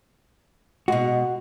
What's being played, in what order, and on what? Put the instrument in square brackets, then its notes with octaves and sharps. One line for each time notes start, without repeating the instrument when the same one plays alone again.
[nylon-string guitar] B2 G#3 [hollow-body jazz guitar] F#4